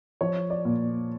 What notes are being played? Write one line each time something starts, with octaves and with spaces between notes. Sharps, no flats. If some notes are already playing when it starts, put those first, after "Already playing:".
F3 C#5
D5
A#2